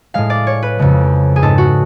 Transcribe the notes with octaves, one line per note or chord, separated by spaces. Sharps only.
A2 G#3 F5
D5
C#5
B4
F2 C#3 G#3
G#4
G#2 G#3 A4
F#4